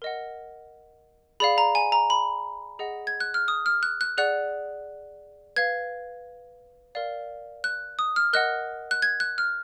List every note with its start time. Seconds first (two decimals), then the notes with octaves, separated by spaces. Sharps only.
0.02 A#4 D#5 F#5
1.40 G#4 D5 F5 B5
1.58 A#5
1.75 G#5
1.92 A#5
2.10 B5
2.79 G#4 D#5 F#5
3.07 G#6
3.20 F#6
3.34 F6
3.48 D#6
3.66 F6
3.83 F#6
4.01 F#6
4.18 G#4 D5 F#5 F#6
5.56 B4 F5 G#6
6.95 A#4 D5 F5
7.64 F#6
7.99 D#6
8.16 F6
8.33 A#4 D#5 F#5 F#6
8.91 F#6
9.02 G#6
9.20 F#6
9.38 F6